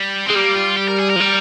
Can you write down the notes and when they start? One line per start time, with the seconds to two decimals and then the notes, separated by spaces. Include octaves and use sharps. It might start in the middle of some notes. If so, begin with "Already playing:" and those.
Already playing: G3
0.27 C4
0.30 G#3
0.35 G3 A#3
0.56 F4
0.77 G4
0.88 A#4
0.99 G#4
1.10 A#4
1.16 F3
1.20 G3